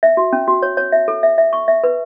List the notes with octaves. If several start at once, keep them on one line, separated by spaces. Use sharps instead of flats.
E5
F#4
C#4
F#4
C#5
C#5
E5
A4
E5
E5
C#6
E5
B4